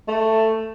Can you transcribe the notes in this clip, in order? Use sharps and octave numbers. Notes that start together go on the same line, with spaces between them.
A3